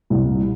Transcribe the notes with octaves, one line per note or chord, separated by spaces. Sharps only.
C2